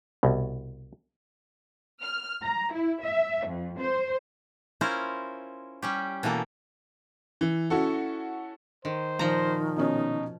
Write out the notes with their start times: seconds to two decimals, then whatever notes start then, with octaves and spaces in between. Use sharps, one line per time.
0.23 C2 B2
2.01 F6
2.42 A#5
2.73 E4
3.04 E5
3.46 F2
3.80 C5
4.81 C#4 E4 F4 A#4 C5
5.82 G3 C#4 G4
6.23 B2 E3 A#3 A4
7.41 E3
7.70 C#4 E4 F#4 A4
8.85 D#3 C5
9.19 A#2 D#3 F3 A#5
9.77 B2 C#4 D#4